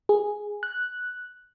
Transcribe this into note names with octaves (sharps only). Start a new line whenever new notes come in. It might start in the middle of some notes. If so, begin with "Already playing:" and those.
G#4
F#6